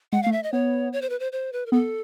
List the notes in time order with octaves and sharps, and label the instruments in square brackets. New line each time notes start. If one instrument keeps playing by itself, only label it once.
[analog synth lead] G#3 [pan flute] F#5
[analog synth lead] A3 [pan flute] F5
[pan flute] E5
D#5
[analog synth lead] B3 [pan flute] C#5
[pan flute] C#5
C5
B4
C5
C5
B4
A#4
[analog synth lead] B3 [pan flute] A4